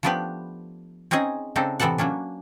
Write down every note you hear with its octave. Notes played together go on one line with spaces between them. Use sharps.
F3 A3 B3 D4 G4 B4
C4 C#4 D#4 G#4 D#5
C#3 C4 D4 D#4 A4
A2 C3 E3 B3 A4 F#5
F#3 A#3 C#4 D4